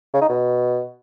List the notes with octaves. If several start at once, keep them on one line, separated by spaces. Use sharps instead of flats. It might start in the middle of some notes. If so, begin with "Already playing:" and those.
C#3
D#4
B2